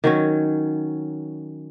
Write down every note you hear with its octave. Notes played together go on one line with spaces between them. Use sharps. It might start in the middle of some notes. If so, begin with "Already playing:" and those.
D#3 F#3 C#4